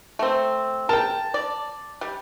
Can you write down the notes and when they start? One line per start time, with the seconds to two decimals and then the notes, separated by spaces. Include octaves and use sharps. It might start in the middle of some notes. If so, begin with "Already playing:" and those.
0.19 A3 C4
0.89 A#4 G5 A5
1.34 D5
2.01 G3